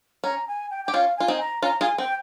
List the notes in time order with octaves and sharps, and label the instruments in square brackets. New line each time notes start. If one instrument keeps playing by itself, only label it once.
[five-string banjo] C#4 [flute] A#5
[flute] G#5
G5
[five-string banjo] G4 [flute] G5
[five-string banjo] C#4 F4 [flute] F5
[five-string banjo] F4 [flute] G#5
[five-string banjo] C4 D#4
[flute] A#5
[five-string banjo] C#4 F4 [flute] A#5
[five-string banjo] F4 G#4 [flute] G#5
[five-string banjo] C4 [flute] G5